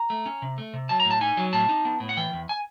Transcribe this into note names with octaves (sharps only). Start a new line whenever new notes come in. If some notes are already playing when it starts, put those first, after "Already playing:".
Already playing: A#5
A3
C#4
C3
A3
C3
F#3 A5
A#5
A2
A5
D#4 G#5
F#3
A2 A5
D#4
B3
A2
F#5
E3 G5
E2
G#5